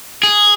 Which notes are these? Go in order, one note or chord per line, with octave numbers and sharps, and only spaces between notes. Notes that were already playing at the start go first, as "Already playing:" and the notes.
G#4